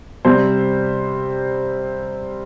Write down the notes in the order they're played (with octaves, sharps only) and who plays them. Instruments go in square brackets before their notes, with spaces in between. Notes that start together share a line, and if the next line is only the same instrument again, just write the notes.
[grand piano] C3 G3 C4 C5